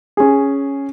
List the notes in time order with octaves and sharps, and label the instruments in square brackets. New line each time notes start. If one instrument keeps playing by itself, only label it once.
[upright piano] C#4 G#4